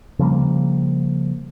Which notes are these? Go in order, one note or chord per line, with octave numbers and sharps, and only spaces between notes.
C#3 F3 G3 A#3